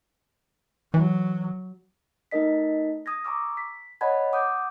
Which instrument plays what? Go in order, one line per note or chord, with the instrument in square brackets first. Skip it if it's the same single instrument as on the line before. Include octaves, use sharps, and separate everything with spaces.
[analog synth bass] E3 [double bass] F#3
[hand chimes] A3 D#4 A#4 D#5 B6
D#6 G#6 A#6
A#5 C#6 D6 E6
B6
C#5 D#5 F#5 A5 B5 G#6
F#5 D6 D#6 G6